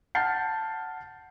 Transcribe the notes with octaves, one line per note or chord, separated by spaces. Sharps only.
F#5 A5 F6 G6 A6 C7